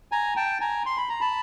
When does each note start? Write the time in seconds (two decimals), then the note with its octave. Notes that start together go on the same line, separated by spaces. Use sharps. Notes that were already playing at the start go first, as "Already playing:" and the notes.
0.12 G#5 A#5
0.36 G5 A5
0.61 G#5 A#5
0.86 C6
0.97 B5
1.09 A#5
1.21 A5 B5